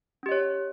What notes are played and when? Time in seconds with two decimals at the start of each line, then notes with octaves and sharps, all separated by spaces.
0.23 C#4
0.26 G4
0.29 D#5
0.32 C#5